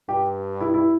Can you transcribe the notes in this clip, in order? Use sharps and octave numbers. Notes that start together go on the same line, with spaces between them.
G2 G4
E4
E4